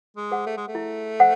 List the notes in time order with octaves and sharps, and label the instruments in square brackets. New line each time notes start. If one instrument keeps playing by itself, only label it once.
[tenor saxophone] G#3
[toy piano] G#4 C5 F#5
[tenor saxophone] A3
G#3
A3
[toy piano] E4
C5 F#5